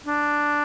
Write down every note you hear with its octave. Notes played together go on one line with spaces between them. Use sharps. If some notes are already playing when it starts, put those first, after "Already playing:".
D4